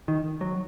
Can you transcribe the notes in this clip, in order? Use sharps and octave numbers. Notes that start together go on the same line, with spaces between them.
D#3
F#3